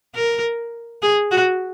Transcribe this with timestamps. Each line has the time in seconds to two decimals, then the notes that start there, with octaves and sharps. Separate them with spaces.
0.15 A#4
1.02 G#4
1.31 F#4